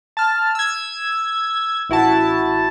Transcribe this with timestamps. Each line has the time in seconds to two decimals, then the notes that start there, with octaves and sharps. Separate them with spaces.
0.17 A5 F6
0.55 E6 G#6
1.89 A1 E4 F#4 A5